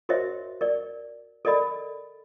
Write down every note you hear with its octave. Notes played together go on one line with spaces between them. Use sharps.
F#4 A#4 C5 C#5 D#5 E5
A#4 D5
A4 A#4 D5 D#5 B5